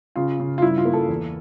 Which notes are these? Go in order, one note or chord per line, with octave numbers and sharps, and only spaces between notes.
C#3 F4
C#3
F4
G2 E4
F4
A#3
A4
E2